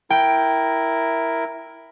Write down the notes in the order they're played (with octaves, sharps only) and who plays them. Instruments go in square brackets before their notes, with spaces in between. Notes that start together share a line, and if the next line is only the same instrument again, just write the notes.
[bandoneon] E4 A#4 [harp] G5